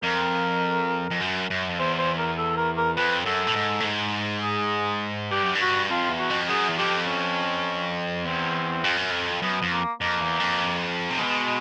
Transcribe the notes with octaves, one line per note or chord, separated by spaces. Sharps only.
F2 A#4
F2
F#2
F#2
F2
E2 C5
C5
A#4
A4
A#4
A#4
F2 B4
F#2 A4
A2
G#2
A2
G#2
G#4
G2 G4
F#2
G2
F#4
F2 F4
E2
F#4
F2
F#2 G#4
E2
F2 G4
C#4
E2 C4
F2
F#2
F2
F#2 B3
F2
A#3
F2 A#3
E2
F2
C3
B2 G#3